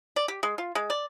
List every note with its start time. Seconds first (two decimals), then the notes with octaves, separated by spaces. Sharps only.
0.16 D5
0.28 G4
0.43 G#3
0.58 F4
0.75 G#3
0.90 D5